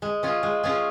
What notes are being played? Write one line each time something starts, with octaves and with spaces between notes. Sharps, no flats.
G#3
C#4 F4 G#4
G#3
C#4 F4 G#4